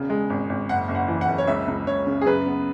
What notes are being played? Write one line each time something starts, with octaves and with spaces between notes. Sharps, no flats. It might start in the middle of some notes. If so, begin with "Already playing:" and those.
Already playing: E1 C#3
G#3
G#1
G#1
F#1 F#5
F#1
F#5
E3
F#5
F#1
C#5
C#2 E5
C#2
C#2 C#5
C#3
G#4
F#2 B4
B3